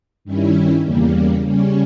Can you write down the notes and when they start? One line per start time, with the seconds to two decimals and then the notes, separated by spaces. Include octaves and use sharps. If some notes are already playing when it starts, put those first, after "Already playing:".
0.25 G2 D#3 G3 C#4 E4
0.84 E2 C#3 G3 A#3
1.44 C#3 G3 C#4